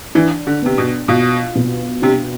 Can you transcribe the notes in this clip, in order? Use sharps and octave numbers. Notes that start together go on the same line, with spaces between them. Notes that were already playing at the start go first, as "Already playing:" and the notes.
E3 D4
D3
C3 B3
B2
B2 F4
B2
C3 D4